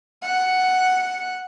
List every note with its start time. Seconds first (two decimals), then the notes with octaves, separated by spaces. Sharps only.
0.23 F#5